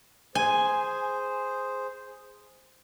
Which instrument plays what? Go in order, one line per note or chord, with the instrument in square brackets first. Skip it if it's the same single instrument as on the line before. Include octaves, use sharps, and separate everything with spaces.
[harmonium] G#4 C5 [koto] G#5